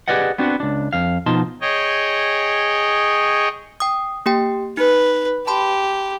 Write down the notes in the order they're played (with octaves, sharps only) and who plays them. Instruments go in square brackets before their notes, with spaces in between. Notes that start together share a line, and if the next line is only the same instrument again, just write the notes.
[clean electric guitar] G4 G#4 B4 D5 D#5 F#5
B3 C4 D4 F#4
C#2 D4
F2 F5
B2 F3 D#4 A5 C6
[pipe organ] G#4 C#5 D#5 G5
[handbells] G5 D#6
A#3 G4 G5
[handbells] D#4 [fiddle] B4
[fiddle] G4 [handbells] A5 B5 C6